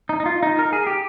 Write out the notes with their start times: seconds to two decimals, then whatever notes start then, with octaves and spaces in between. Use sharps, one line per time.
0.09 D#4
0.20 D#4
0.26 F4
0.43 D#4
0.59 A#4
0.73 G#4
0.87 G4